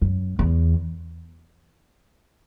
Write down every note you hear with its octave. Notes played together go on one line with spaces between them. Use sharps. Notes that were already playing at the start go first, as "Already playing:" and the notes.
F#2
E2